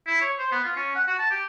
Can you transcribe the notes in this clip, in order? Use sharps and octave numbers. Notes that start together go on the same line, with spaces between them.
E4
C#5
C5
B3
F4
C#4
F#5
F#4
A5
G4